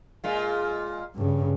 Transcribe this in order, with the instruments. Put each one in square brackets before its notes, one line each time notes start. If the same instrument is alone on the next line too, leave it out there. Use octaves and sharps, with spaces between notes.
[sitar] A#2 G#3 F4
[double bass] G2 C#3